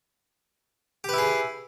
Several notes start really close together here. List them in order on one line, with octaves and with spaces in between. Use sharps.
G4 B4 E4 G#4